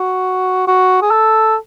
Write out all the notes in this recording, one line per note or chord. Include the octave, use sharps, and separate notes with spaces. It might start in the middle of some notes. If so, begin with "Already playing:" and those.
Already playing: F#4
F#4
G#4
A4